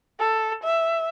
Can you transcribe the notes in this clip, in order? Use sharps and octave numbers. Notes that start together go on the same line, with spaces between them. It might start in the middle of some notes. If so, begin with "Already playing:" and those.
A4
E5